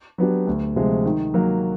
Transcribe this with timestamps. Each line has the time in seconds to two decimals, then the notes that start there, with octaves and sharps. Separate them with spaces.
0.18 F#3 B3 D4 G4
0.47 D2
0.76 C3 F3 G#3
1.05 D#3
1.34 F#3 A#3